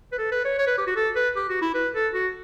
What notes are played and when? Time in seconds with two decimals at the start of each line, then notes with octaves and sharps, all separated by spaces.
0.12 B4
0.18 A4
0.32 B4
0.45 C#5
0.58 C#5
0.67 B4
0.78 G4
0.87 F#4
0.96 A4
1.16 B4
1.36 G4
1.49 F#4
1.62 E4
1.75 B4
1.95 A4
2.14 F#4